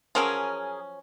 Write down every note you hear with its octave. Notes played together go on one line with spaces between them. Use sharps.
F3 F#3 C#4 G#4 A#4 D#6